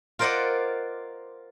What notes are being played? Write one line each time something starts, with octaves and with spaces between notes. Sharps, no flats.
F4 A#4 C5 D5 D#5 F#5